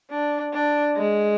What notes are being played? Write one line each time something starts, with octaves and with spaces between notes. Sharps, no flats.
D4
D4
G#3